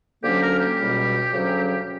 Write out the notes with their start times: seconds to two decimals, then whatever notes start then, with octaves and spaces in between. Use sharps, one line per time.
0.22 D2 D3 F#3 A#3 C#4 G4
0.42 A#4
0.60 G4
0.77 C#2 B2 G3
1.33 D2 C#3 F#3 C#4